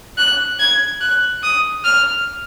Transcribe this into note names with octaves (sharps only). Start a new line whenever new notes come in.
F#6
G#6
F#6
D#6
F6